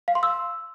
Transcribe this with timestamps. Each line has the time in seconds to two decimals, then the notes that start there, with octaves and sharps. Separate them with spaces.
0.08 F5
0.15 C6
0.23 E6